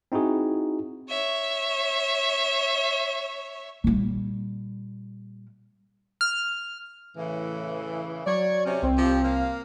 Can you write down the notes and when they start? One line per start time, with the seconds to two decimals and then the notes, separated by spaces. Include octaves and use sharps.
0.12 C4 D#4 E4 F#4 G#4
1.09 C#5 E5
3.84 A#2 G3
6.21 F6
7.16 A2 C#3 E3
8.27 F#3 C#5 D5
8.65 C3 C#4
8.82 C2 C4
8.97 F3 G4
9.25 A#3 F5